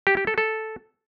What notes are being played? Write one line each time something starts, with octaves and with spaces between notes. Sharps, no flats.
G4
G4
A4
A4